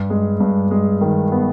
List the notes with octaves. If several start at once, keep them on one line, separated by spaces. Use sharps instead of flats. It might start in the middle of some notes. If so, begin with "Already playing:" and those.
Already playing: G2
G#3
G2
G#3
D#3
B3